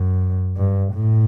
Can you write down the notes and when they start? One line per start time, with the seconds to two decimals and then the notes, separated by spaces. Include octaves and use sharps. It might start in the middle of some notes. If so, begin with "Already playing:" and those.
Already playing: F#2
0.57 G2
0.93 A2